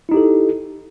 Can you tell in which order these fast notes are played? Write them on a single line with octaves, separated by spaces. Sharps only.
E4 D#4 G4 A4